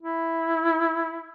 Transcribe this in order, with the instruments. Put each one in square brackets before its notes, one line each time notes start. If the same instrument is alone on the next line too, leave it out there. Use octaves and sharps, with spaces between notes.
[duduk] E4